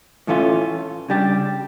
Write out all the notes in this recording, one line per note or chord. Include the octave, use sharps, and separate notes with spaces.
A2 E3 A3 C#4 F4
C#3 G3 D4 G4